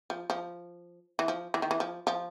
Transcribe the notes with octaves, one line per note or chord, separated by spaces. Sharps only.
F3
F3
E3
F3
E3
D#3
E3
F3
F3